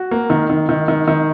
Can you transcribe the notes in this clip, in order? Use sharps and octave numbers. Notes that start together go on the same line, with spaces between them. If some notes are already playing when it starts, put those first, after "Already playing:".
Already playing: F#4
A#3
D#3
D#3
D#3
D#3
D#3